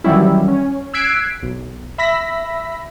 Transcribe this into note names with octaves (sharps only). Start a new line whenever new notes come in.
D#3 E3 F#3 G3 C#4 E4
C#4
E6 F#6 G#6 B6 C7 D7
B1
E5 B5 E6 A#6 B6